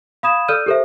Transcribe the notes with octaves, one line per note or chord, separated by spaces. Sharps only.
F5 B5 D#6 G#6 E7
A4 D5 E6 F6 G6 D#7
G4 A4 A#4 C5 E5